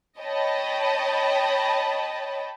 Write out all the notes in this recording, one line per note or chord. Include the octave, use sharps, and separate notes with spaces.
C#5 D#5 G5 A5 B5